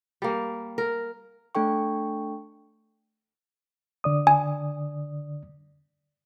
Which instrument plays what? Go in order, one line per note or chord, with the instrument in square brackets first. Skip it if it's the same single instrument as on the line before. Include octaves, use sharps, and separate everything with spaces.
[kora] G3 A#3
A#4
[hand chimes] A3 D4 A4 G5 C#6
[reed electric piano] D3 D5 D#6
[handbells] G#5